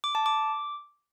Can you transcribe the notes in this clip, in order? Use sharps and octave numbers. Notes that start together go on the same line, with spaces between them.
D6
A5
D6